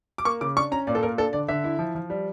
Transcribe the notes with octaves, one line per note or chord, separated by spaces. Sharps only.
D6
A#3 C#6
C#3 D6
D4 C#6
C#4 A#5
A#2 D5
A4
A#2 A#4
D4 A4
D3 D5
D3 E5
E4
F3
F3
G3